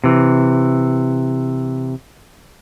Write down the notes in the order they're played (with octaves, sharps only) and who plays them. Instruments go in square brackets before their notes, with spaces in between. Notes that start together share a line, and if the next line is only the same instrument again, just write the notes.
[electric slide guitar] C3 E3